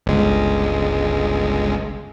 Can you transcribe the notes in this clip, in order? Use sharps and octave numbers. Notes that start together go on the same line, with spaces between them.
G1 C#2 G#3